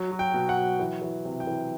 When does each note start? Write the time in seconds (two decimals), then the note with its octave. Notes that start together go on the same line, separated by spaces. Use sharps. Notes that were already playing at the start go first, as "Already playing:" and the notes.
Already playing: F#3
0.11 F#3
0.19 G5
0.34 B2
0.49 F#5
0.57 F#3
0.79 E3
1.02 E3
1.25 C3
1.40 G5
1.47 E3